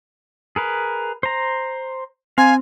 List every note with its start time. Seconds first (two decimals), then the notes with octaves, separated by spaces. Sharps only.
0.56 G#4 A#4 B4
1.23 C5 A#5
2.38 C4 F5 G#5